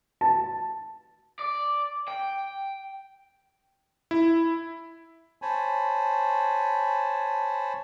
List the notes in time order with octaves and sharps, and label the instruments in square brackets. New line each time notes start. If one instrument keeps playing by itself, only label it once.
[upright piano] A5
[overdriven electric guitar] D5
G5
[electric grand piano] E4
[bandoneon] C5 C#5 G#5 A5 B5